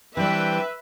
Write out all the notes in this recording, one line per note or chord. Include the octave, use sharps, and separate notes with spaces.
E3 G3 C4 D4 B4 E5 G5